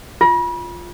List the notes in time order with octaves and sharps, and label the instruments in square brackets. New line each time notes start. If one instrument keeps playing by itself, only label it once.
[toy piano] F4